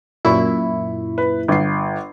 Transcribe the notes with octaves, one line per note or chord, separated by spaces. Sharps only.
F#2 A#2 E4 B5 C#6
B4
G1 C7